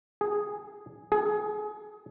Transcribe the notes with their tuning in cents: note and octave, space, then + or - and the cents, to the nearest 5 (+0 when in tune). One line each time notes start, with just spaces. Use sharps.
G#4 +0
G#4 +25